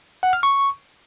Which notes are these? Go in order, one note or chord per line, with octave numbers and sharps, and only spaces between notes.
F#5
F6
C#6